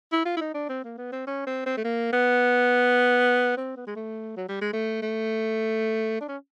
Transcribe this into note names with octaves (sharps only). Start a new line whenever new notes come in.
E4
F4
E4
D#4
D4
C4
A#3
B3
C4
C#4
C4
C4
A3
A#3
B3
C4
B3
G#3
A3
F#3
G3
G#3
A3
A3
D4
C#4